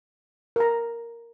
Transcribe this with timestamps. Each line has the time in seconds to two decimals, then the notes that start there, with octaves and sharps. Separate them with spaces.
0.56 A#4 A#5